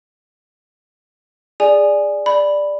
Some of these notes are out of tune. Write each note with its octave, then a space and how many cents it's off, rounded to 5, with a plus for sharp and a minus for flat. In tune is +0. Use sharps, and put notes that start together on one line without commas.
G#4 -15 D5 +0 G#5 +0
D5 +0 B5 +0